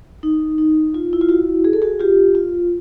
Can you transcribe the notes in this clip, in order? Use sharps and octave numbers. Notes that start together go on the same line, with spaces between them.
D#4
D#4
F4
E4
F4
E4 F#4
G#4
A4
F#4 G#4
F4 G4
F4